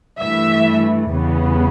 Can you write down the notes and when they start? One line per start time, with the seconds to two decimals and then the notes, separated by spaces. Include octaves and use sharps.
0.19 G2 E3 A3 E5
1.09 E2 C#3 G3 B3